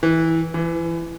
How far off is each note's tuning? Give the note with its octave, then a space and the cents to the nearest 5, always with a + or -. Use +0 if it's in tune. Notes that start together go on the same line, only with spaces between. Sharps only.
E3 -15
E3 +25